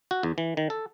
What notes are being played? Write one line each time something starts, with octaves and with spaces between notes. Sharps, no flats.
F#4
E2
E3
D#3
A4